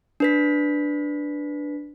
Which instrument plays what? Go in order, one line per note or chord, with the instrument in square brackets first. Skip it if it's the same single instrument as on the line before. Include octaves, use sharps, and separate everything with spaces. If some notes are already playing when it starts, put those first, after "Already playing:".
[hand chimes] D4 B4 B6